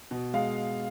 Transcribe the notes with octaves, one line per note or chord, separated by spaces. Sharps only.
B2
G#3 F5